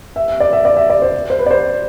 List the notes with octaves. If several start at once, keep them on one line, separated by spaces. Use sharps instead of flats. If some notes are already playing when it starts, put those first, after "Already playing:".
E5
E5
D5
E5
D5
E5
D5
C5
C5
B4
D5
C5